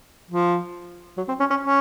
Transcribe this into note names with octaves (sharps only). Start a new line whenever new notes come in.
F3
F#3
C4
C#4
C#4
C#4